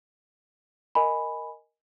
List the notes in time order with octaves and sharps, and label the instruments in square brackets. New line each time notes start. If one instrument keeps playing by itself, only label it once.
[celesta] A#4 D#5 G#5 B5